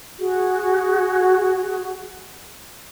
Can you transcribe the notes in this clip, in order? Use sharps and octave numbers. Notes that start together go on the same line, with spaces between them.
F#4 G#4